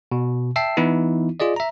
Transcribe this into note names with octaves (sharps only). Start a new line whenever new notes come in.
B2
E5 G5 A5 E6 C7
E3 B3 D#4 E4
F4 G#4 D5 D#5
E5 A#5